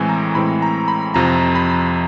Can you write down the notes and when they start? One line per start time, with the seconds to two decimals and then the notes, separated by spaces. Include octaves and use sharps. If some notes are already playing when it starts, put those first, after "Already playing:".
Already playing: A2 E3 G#3 C4 G#5
0.09 A#5
0.35 A2 E3 G#3 C4 B5
0.62 A#5
0.88 B5
1.14 F2 C3 F3 A#5
1.55 B5